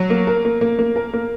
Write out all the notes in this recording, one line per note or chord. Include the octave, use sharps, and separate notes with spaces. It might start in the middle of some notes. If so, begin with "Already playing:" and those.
Already playing: F#3
A#3
A#4
A#3
A#3
A#3
A#4
A#3